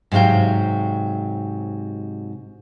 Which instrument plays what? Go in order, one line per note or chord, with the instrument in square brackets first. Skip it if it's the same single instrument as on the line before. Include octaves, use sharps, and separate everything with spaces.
[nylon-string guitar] G#2 C3 F#3 F5 G5